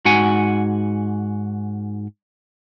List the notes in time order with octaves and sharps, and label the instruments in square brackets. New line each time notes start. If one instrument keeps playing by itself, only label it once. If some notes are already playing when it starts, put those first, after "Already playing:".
[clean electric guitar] G#2 F#4 F#5 G#5